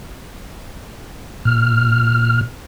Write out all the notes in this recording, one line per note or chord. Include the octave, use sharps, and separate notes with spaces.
A#2 F6